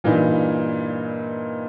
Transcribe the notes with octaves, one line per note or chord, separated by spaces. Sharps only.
G2 A#2 E3 D#4